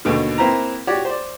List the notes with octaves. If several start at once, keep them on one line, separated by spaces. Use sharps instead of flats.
D#2 B2 D3
A#3 C4 E4 B4 A#5
F#4 G4 C#5 D5
C5 D5